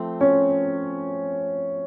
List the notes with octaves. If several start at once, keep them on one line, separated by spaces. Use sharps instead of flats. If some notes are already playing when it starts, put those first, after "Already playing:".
Already playing: F3 A3 C4
C#4